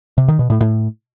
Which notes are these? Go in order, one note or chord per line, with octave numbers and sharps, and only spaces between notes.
C3
D#3
B2
A2
A2